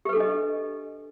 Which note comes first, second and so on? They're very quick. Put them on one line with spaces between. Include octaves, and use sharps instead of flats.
G4 B4 A4 D4 D#5